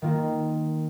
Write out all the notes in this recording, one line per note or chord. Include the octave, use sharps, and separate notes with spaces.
D#3 A#3 F4